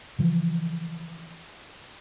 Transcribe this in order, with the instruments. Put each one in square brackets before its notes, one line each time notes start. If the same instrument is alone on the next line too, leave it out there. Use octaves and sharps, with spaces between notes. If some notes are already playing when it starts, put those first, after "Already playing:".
[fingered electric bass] C#3 E3 F3